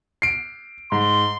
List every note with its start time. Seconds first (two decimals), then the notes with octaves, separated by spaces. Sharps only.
0.22 C7 D7
0.92 G#2 C6